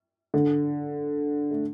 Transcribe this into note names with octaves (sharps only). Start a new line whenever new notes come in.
D3
A3